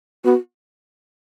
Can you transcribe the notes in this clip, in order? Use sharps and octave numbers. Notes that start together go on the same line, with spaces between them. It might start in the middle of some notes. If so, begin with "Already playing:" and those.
B3 F#4